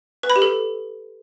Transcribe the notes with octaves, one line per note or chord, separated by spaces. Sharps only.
B4
B5
G4
A4